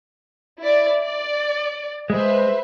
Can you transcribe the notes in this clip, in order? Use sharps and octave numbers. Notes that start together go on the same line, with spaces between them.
E4 D5
D5
G#3 B4 C5 E5